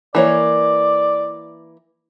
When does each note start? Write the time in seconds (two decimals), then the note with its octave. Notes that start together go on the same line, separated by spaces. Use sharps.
0.15 E3 A#3 C#5 D5